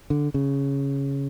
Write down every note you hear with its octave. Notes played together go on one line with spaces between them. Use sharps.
D3
C#3